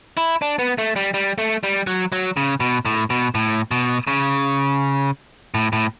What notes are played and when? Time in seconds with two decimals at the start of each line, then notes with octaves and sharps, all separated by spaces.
0.17 E4
0.42 D4
0.59 B3
0.78 A3
0.96 G3
1.14 G3
1.38 A3
1.64 G3
1.87 F#3
2.12 F#3
2.37 C#3
2.60 B2
2.85 A2
3.10 B2
3.35 A2
3.71 B2
4.07 C#3
5.54 A2
5.73 A2